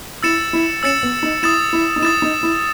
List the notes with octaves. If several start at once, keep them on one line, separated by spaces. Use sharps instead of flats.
E4 E6 A6 C#7 E7
E4
C#4 E6 A6 C#7 E7
B3
D#4
E4 D#6 A6 E7
E4
D#4
E4 D#6 A6 E7
D#4
E4